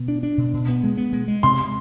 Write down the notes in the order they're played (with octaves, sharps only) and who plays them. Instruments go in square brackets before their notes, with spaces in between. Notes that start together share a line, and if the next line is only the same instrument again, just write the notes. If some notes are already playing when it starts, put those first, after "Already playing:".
Already playing: [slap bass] B2
D4
D4
B2
B2
B3
G#3
B3
G#3
G#3
[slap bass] C3 [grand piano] C6